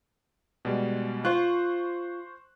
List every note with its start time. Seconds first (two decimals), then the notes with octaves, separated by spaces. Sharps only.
0.65 B2 G3 G#3
1.25 F4 C5 C#6 F#6